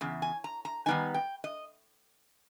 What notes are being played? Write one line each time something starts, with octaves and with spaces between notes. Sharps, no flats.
E2 C#3
G#5
A#5
A#5
D#3 G3 B3 D#4 G#5
G5
D#5